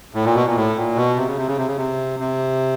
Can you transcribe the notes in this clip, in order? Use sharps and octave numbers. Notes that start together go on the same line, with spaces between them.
A2
A#2
B2
A#2
A2
A#2
B2
C3
C#3
C3
C#3
C3
C#3
C3
C3